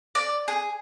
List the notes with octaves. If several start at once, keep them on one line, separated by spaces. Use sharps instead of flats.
D5
G#4